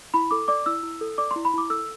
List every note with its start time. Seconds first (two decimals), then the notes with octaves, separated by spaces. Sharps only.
0.14 E4 B5
0.31 A4 D6
0.48 D5 D6
0.66 E4 E6
0.83 E4
1.01 A4
1.18 D5 D6
1.31 C6
1.36 E4
1.45 B5
1.54 E4 D6
1.70 A4 E6